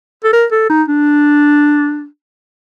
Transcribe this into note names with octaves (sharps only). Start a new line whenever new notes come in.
A4
A#4
A4
D#4
D4